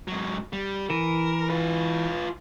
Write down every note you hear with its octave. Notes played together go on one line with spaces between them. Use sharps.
G#2 F#3
G3
E3 A#4
F4 B4